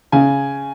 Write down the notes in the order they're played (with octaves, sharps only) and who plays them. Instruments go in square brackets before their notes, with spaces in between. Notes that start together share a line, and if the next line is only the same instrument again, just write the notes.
[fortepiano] C#3 [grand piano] G#5